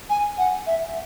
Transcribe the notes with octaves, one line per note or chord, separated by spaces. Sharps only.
G#5
F#5
E5